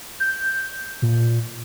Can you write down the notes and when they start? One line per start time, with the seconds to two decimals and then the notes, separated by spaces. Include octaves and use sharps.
0.20 G6
1.02 A#2